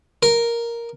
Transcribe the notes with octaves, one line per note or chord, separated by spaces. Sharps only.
A#4